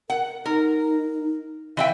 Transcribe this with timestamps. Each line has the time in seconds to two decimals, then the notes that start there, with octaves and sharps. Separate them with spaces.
0.10 A#4 F#5
0.46 D#4 A#4
1.77 E3 E5 F5 G5